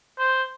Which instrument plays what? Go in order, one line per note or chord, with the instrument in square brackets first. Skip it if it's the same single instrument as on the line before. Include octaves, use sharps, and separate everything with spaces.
[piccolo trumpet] C5